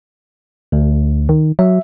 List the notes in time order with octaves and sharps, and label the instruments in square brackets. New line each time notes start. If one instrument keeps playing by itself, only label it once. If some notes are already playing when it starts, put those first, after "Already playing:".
[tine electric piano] D2
[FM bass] D#3
[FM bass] F#3 [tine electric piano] E5